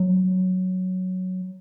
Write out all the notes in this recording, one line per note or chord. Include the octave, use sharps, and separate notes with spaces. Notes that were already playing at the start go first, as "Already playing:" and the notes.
Already playing: F#3